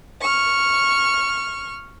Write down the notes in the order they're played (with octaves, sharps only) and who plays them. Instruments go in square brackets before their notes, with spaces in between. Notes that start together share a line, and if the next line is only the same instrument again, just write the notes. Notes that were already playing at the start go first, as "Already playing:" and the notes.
[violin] C#6 F6